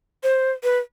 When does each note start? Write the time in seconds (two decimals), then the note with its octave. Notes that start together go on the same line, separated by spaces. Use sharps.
0.24 C5
0.64 B4